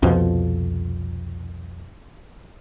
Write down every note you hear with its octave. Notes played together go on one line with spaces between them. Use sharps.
C2 F2 B2 F3